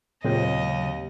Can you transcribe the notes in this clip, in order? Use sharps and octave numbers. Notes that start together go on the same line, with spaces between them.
D#2 A#2 C#3 F#3 G#3 C4 D#5